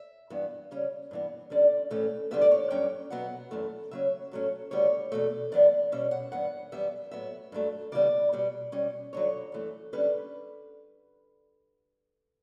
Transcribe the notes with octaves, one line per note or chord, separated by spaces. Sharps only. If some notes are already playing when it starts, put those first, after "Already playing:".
Already playing: E5
G2 E3 B3
C#3 G3 C#4
G2 E3 B3
E2 D3 G3 C#4 D5
A2 E3 A3 C#4
E2 D3 G3 B3 E5
D5
C#5
G2 F#3 C#4 G5
B2 F#3 B3 F#5
F#2 E3 A3
C#3 F#3 C#4 E5
A2 F#3 A3 C#4
D2 C#3 G3 B3 C#5
E2 B2 A3
F#2 E3 B3 D5
B2 G3 C#4 E5
F#5
G2 E3 B3 F#5
F#2 E3 G3 B3 E5
A2 F#3 B3 E5
G2 F#3 A3
C#3 E3 G3 B3 D5
B2 G3 B3
B2 G3 C#4
G2 D3 F#3 C#5
F#2 E3 A3
D3 G3 C#4 B4